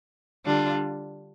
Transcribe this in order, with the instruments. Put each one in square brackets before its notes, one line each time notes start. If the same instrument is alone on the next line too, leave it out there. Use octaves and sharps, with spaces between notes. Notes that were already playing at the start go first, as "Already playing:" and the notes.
[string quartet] D3 G3 D4 F4